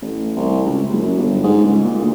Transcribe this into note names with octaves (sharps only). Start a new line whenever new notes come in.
A1
C2
C#2
F#1
F#2
G1
G#2
C#2
A#2
D2